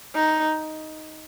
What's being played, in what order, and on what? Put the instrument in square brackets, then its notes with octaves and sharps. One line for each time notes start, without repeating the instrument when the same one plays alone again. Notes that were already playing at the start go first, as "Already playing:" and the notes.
[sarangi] D#4